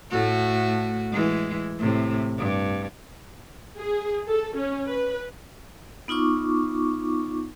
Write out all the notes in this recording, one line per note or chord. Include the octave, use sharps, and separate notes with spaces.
A2 A3 F#4
E3 G#3
A2 C3
G2
G#4
A4
C#4
B4
B3 D#4 F4 C#6 D6